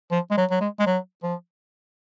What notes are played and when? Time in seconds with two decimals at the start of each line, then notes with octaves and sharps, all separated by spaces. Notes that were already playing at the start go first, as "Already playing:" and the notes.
0.11 F3
0.31 G#3
0.37 F#3
0.51 F#3
0.61 G#3
0.79 G#3
0.86 F#3
1.23 F3